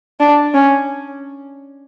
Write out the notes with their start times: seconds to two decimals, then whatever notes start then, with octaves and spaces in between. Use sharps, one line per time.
0.20 D4
0.54 C#4